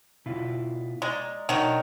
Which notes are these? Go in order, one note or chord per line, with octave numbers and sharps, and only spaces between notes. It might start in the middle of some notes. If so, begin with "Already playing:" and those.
B2 E4 F4
G#3 D5 A#5
B2 D#3 F#3 D4